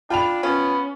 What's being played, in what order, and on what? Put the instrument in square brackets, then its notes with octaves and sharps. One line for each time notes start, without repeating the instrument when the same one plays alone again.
[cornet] D4 [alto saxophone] F4 [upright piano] G5 B5 F7
[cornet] B3 [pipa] C#4 [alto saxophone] F4